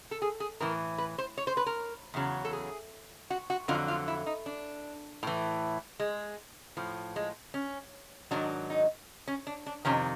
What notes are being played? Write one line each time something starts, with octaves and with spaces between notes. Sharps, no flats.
A4
G#4
G#4
A2 E3 A#4
B4
C5
C#5
C5
B4
A#4
E2 C#3 F#3
A4
G#4
F#4
F#4
F2 D3 F#3 F4
F4
E4
D#4
D4
A2 E3
G#3
A2 F3
G#3
C#4
G#2 D#3 F#3 D4
D#4
C#4
D4
D4
F2 C3 D#3 C#4